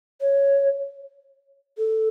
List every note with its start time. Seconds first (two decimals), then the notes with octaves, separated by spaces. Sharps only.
0.21 C#5
1.78 A4